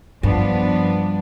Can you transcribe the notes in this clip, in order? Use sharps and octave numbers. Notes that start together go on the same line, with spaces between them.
G2 F3 B3 D4